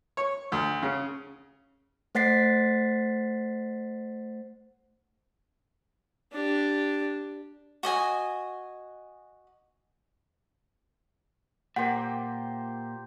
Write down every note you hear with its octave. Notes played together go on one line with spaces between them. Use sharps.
C#5
D2
C#3
A3 C5 F#5 A6 B6 C7
D4 G4
F#4 D#5 G#5
A#2 G4 C5 F#5